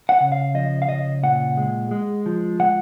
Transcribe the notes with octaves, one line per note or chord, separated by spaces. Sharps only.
F#5
C#3
F5
F3 D#5
F5
C#3 D#5
A#2 F#5
G#3
G#3
F3
G#3 F#5